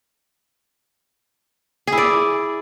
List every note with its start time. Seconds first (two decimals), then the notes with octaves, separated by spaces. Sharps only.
1.87 G#4
1.92 E4
1.97 D5